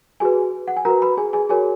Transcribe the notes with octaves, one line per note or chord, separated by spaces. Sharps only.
F#4 G#4 B4 G#5
F#5
G#5
F#4 A#4 B4 A#5
B4 B5
G#4 G#5
G#4 G#5
F#4 G#4 A#4 C#5 G#5